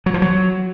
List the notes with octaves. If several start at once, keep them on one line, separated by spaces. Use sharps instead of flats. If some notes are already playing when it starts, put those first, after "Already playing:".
F#3
F3
F#3